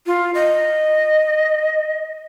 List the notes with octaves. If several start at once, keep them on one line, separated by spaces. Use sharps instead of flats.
F4
D#5